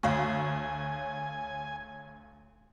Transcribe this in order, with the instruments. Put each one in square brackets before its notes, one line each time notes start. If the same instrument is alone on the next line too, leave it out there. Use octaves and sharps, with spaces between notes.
[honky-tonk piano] D2 [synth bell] C#5 F5 C#6 [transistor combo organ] G#5